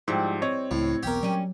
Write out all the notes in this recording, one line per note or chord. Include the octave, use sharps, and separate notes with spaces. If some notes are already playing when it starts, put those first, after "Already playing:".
G#2 F3 G3 E4
C4 C#5 D#5
C#2 A2
B1 E2 B3 G4 A#4
F#3 G3 C#4